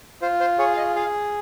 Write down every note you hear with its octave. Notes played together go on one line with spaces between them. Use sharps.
F4 C5
C5
G#4 C#5
F5
D#5
G#4 F5